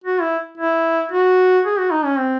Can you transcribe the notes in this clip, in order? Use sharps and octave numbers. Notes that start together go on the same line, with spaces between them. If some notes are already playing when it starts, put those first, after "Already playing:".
F#4
E4
E4
F#4
G#4
F#4
D#4
C#4
C4